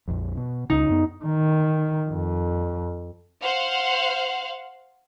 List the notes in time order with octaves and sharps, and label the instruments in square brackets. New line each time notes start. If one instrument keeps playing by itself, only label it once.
[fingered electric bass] A#1 F2
B2
[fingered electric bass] C#2 C#3 [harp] D#4
[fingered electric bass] F#2 B3
[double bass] D#3
F2
[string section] C5 F5 F#5